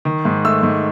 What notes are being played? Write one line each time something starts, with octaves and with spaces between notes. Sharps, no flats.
D#3
G#2
A3 E6
G#2